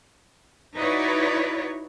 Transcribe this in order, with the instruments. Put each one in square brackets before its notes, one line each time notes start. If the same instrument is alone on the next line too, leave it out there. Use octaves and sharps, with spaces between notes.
[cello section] D#4 E4 F#4 B4 C#5 D5